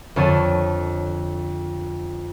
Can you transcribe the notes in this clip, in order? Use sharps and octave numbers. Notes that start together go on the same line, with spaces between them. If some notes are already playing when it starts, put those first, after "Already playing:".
F2 D3 C#5 A5 D#7